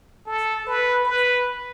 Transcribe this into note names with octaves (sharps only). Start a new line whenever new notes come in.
A4
B4
B4